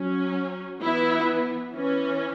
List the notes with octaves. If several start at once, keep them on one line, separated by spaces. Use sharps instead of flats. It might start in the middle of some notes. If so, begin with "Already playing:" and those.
Already playing: F#3 C#4
E3 B3 E4
E3 C#4